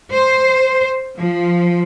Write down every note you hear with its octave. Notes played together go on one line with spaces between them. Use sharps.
C5
F3